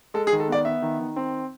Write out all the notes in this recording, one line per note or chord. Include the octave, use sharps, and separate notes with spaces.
G#3 A4
G#4
D#3
A4
B3 D5
B3 E5
D#3
D#3
C4